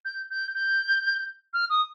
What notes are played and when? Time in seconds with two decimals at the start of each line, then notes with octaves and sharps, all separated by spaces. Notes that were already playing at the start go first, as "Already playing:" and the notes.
0.05 G6
0.30 G6
0.55 G6
1.53 F6
1.70 D#6